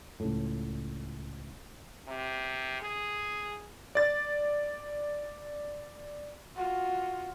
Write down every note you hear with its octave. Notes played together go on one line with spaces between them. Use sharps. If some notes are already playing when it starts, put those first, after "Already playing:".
C#2 A2
C3
G#4
D5 A6
F4 F#4